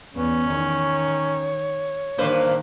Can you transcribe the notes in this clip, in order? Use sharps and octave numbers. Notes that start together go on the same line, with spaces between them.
E2 B3 C#4
D#3 C#5
G2 D#3 A#3 B4 C5